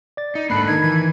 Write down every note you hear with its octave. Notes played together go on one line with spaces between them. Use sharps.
D5 A6
D#4
G#2 A#3 D4 A4 B5 F#6 C7
D#3 D#4 G#6
E3